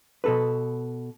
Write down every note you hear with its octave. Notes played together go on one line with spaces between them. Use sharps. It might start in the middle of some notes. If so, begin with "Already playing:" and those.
B2 A4 B4